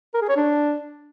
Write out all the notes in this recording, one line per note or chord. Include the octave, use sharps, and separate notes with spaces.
A#4
G#4
C#5
D4